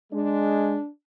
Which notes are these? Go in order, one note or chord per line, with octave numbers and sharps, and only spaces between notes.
G#3 D4